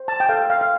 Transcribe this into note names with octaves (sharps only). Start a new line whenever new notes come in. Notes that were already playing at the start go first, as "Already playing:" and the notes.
Already playing: C5
A5
G5
A4 F5
F5
F5